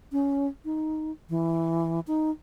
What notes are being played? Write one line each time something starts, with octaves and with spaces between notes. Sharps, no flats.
C#4
D#4
E3
D#4